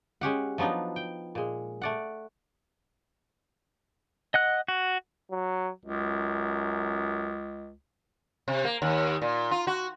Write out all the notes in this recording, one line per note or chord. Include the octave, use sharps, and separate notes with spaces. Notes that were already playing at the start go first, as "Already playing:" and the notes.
G#3 C#4 G4 F#5
F3 F#3 B3 D4 D#4
G5
A#2 G#3
A3 D5 F#5
D#5 F#5 F#6
F#4
F#3
C#2 F#2
C3
A#3
D#2
A#2
F4
F#4